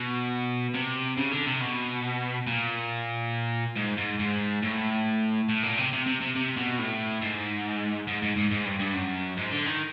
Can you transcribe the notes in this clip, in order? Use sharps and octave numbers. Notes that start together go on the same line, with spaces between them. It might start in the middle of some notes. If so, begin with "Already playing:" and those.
Already playing: B2
C3
C#3
D3
C3
B2
A#2
G#2
G#2
G#2
A2
A2
A#2
C3
C3
C3
C3
C3
B2
A2
G#2
G#2
G#2
G#2
G#2
G2
G2
F#2
G#2
D3
D#3